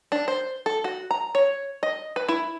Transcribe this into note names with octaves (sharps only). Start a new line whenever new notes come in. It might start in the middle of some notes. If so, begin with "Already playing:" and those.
D4
C5
A4
F#4
A#5
C#5
D#5
B4
E4